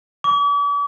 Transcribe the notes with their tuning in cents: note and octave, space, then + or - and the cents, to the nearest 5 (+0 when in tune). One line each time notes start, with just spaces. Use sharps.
D6 -45